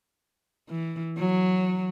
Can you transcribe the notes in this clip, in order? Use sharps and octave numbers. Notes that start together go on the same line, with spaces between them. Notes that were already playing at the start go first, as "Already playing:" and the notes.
E3
F#3